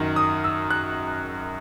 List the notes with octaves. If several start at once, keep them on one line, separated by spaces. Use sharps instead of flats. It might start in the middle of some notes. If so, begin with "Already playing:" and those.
Already playing: F#2 D#3
D#6
E6
F#6